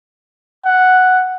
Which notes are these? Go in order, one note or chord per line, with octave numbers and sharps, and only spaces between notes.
F#5